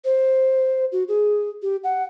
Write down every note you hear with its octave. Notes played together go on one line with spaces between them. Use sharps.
C5
F#4
G#4
G4
F#5